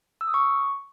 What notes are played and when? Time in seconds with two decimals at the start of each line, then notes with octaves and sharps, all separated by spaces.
0.21 E6
0.27 D#6
0.34 C#6